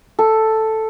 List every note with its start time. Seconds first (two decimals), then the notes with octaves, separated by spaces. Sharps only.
0.19 A4